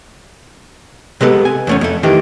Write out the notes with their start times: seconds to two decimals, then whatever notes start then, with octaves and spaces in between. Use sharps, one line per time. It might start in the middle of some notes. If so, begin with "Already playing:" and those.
1.21 C3 G#3 B3 A4
1.45 G#5
1.67 E2 A3 C#4
1.81 F2 A3
2.03 D#3 E3 A3 G4